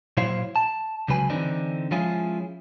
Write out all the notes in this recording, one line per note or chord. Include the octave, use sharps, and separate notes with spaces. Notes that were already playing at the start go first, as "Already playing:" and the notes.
A#2 F#3 E4 C5 C#5 F5
A5
C#2 C#3 F#3 B4 G#5
D3 E3 C4 D4 D#4
F3 G#3 C#4 E4 F4 G#4